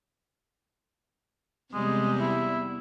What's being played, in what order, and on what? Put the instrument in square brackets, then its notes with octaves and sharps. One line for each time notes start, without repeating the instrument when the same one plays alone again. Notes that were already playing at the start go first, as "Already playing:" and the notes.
[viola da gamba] E2 C3 G3 [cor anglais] G#3
[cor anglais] E4